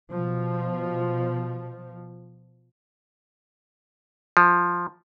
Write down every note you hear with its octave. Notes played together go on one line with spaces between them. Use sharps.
B2 F3
F3